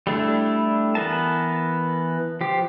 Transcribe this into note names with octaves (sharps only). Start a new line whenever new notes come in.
G3 A3 D4 E4
E3 B3 A#4 A5
F3 G4